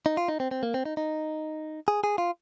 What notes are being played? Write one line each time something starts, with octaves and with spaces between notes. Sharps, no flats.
D#4
F4
D#4
C4
C4
A#3
C4
D#4
D#4
G#4
G#4
F4